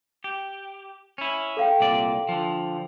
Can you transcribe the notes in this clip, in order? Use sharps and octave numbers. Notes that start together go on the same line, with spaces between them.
G4
C#4 E4
A4 F5 G5
C2 A#2 D5
D3 F3